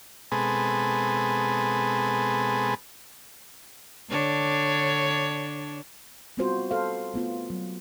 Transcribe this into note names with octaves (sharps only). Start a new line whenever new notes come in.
B2 G#3 C4 G#4 A4 B4
D3 D4 C#5
G3 B3 C4 F4 F#4 C5
A4 B4 C5 F5
A3 B3 F4
F#3